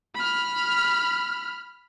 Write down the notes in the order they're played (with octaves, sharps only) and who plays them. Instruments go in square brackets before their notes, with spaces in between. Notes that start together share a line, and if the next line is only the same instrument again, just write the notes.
[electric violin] B5 F6